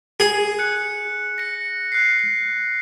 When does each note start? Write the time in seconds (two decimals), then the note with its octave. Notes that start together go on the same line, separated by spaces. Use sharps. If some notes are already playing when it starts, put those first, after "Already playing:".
0.20 G#4
0.59 F#6 C#7
1.38 A#6 C#7
1.92 F#6 C7